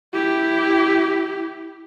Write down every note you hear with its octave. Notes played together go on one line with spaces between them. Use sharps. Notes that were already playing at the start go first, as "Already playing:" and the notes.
E4 G4